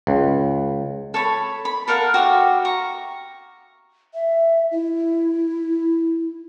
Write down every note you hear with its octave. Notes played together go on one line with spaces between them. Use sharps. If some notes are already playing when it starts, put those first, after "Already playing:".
C#2
A4 C#5 B5
B5
A4 A#4 F5 F#5
F#4 G4 E5 F5
A#5 C#6
E5
E4